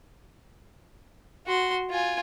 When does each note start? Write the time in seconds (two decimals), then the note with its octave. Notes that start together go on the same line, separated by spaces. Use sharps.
1.47 F#4 C6
1.90 F4 G#5